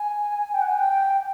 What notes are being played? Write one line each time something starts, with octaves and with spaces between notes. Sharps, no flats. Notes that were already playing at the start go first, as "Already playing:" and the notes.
Already playing: G#5
G5
F#5
G#5
G5